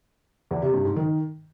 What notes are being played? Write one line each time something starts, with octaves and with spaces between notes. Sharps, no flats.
E2
C3
G2
G#2
D#3